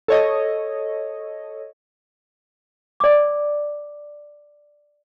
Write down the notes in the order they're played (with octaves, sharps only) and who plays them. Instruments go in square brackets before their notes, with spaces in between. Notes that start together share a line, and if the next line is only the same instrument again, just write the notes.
[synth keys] A4 C#5 D#5
[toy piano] D5 D6